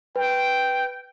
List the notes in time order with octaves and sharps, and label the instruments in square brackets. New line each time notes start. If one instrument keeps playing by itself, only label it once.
[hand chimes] B4 [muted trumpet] G5